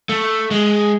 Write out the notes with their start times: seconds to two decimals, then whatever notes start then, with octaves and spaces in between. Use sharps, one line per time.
0.09 A3
0.51 G#3